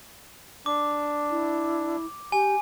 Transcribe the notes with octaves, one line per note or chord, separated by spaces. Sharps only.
D4 D6
E4
G4 G#5